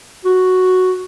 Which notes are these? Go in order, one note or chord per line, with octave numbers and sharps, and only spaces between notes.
F#4